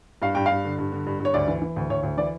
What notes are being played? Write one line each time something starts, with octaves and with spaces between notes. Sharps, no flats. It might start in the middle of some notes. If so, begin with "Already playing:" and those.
G2 F5
G2 G5
G2 F5
D3
G2
D3
G2
G2
C#5
D2 D5
E3
E3
D2
D2 C#5
D2
E3 D5